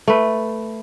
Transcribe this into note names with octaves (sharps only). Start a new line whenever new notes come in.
A3 B4